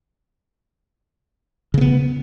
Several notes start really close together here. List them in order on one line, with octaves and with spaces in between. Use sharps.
C#3 A#3 B3